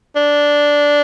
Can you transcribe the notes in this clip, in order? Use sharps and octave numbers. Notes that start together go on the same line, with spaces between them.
D4